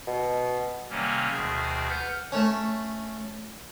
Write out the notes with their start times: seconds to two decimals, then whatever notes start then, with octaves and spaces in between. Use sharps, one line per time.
0.07 B2
0.90 C3 D#3 F#3 G3 A#3 C#4
1.31 D2 B2 D#3 G#4
1.88 B4 F#5 F6 G6
2.32 A3 C#4